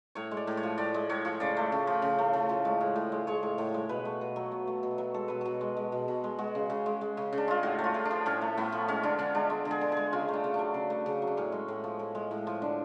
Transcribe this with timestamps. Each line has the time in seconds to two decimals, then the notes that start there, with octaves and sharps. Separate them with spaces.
0.15 A2 C#5
0.31 G#3
0.37 D5
0.47 A2
0.57 C#5
0.63 F3
0.78 A2 D5
0.94 G#3
1.09 A2 C#5
1.25 F3
1.40 C#3 D5
1.57 A3
1.72 C#3
1.87 F3
2.02 C#3
2.18 A3
2.33 C#3
2.49 F3
2.65 G#3
2.81 A2
2.96 A2
3.12 G#3
3.27 G#3 C#5
3.43 A2
3.58 A2
3.74 G#3
3.89 B2 B4
4.05 A3
4.21 B2
4.36 F#3
4.52 B2
4.67 A3
4.83 B2
4.98 F#3
5.14 G#3 A4
5.28 B2 B4
5.41 B2 A4
5.61 G#3
5.77 G#3
5.92 B2
6.08 B2
6.24 G#3
6.38 G#3 F#4
6.55 C#3
6.70 C#3
6.86 G#3
7.01 G#3
7.17 C#3
7.33 C#3
7.38 D4
7.48 G#3 F4
7.63 A2 F#4
7.78 A3
7.84 F4
7.94 A2
8.05 D4
8.10 F3
8.26 A2 C#4
8.41 A3
8.57 A2 B3
8.72 F3
8.88 G#3 C#4
9.03 D3 D4
9.18 D3 C#4
9.35 G#3 D4
9.50 G#3
9.65 D3
9.71 G#4
9.81 D3
9.92 G#3 G#4
10.13 C#3 F4
10.28 A3
10.33 D4
10.44 C#3
10.54 F#3 D4
10.74 C#3
10.90 A3
11.06 C#3
11.22 F#3
11.27 D4
11.37 A2 C#4
11.52 G#3
11.68 A2
11.84 F3
11.99 A2
12.15 G#3
12.31 A2
12.47 F3
12.62 D3 D4